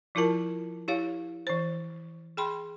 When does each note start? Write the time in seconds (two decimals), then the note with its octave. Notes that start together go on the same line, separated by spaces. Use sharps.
0.15 F3 E4 F4 A#4 A5
0.88 E4 G4 C#5 F5
1.47 E3 C5
2.37 G#4 G5 B5 C6